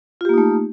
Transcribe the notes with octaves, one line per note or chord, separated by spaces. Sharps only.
A3 A#3 D#4 F4 G4